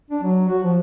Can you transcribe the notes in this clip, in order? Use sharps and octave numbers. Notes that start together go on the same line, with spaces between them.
D4
F#3
F#4
F3